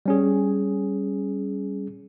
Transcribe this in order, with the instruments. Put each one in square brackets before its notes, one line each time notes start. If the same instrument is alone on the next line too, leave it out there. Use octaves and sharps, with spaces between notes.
[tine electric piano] G3 C#4 G#4